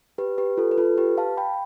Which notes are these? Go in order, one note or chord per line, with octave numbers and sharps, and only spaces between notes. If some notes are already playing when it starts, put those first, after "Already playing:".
G4 B4
G4 B4
F4 A4
B4
F4 A4
G4 B4
F5 A5
G5 B5